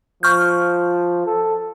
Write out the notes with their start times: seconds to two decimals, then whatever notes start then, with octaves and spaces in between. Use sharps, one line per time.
0.23 F3 C#6 F6 G6
1.26 A4